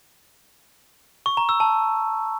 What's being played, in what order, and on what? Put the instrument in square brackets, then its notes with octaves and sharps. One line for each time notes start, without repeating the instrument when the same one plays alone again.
[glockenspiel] C#6
A#5
E6
A5